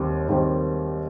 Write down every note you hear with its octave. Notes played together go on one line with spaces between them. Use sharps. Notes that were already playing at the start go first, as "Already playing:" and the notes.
Already playing: D#2 D#3 G3 C4
D#2 D#3 G3 C4